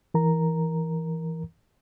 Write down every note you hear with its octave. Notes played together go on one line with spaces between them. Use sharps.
E3 A#4 A#5